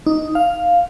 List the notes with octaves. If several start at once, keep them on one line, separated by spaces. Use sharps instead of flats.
D#4
F5